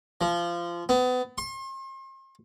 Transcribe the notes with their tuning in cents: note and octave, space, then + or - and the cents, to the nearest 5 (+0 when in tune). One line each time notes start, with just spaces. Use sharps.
F3 -20
B3 +30
C6 +40